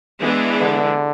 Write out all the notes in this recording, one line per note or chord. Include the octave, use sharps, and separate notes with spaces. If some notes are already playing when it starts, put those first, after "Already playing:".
E3 G#3 B3 D4
D3